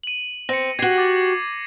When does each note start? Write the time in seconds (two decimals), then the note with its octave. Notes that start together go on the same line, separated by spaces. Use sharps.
0.03 D#7 F#7
0.49 C4 A#6 C#7
0.79 F#4 G4 G#6 C7
0.98 D6 A6